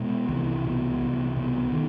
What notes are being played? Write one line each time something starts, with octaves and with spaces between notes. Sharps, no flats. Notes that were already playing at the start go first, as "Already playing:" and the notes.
Already playing: B2 G#3
C2 E3
B2
C2
B2
D#3